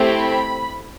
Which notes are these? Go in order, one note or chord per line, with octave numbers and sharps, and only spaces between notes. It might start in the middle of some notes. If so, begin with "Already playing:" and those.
Already playing: A3 C4 E4 G4
B5